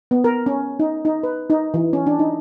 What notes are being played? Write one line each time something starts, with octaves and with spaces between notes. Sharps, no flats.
B3
A#4
C#4
D#4
D#4
B4
D#4
E3
C#4
D4
D#4